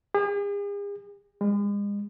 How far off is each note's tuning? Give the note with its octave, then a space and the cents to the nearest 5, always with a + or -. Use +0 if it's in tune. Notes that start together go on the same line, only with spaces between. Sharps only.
G#4 -45
G#3 -40